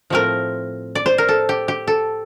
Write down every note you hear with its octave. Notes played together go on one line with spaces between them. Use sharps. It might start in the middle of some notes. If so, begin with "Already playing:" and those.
A2 F3 A3 C4 A#4
D5
C5
A#4
A4
G4
G4
A4